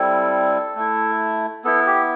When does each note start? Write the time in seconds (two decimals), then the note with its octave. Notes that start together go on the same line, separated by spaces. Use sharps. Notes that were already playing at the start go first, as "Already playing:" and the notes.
Already playing: G3 C4 E4 A4
0.75 A3 E4
1.64 B3 E4 A4
1.87 G4